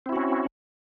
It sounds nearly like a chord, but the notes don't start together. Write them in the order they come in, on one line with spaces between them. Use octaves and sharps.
C4 E4 F#4 C#4